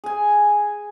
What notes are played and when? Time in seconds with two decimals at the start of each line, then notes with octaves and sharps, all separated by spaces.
0.04 G#4 G#5